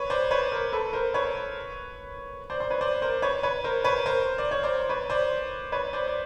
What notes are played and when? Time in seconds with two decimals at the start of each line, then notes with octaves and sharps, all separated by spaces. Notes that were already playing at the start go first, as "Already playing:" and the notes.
Already playing: B4 C#5
0.10 C5 D5
0.31 B4 C#5
0.52 A#4 C5
0.73 A4 B4
0.93 A#4 C5
1.14 B4 C#5
2.50 C5 D5
2.60 C5 D5
2.70 B4 C#5
2.81 C5 D5
3.02 A#4 C5
3.22 B4 C#5
3.43 B4 C#5
3.64 A#4 C5
3.84 B4 C#5
4.06 A#4 C5
4.38 D5
4.51 C#5
4.63 C5 D5
4.89 B4 C#5
5.10 C5 D5
5.72 B4 C#5
5.93 C5 D5
6.07 D5